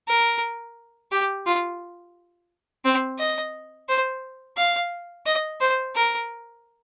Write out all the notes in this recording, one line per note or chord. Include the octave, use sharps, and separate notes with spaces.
A#4
G4
F4
C4
D#5
C5
F5
D#5
C5
A#4